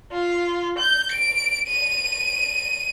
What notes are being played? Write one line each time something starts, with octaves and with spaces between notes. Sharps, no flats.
F4
G6
D7
D#7